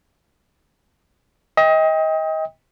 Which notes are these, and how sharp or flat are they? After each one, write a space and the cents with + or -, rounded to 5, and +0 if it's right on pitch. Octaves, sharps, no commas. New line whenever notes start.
D#5 +30 G5 +25